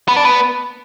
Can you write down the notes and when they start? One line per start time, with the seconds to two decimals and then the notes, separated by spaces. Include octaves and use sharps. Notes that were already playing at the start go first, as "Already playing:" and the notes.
0.08 B3
0.16 D4
0.25 B3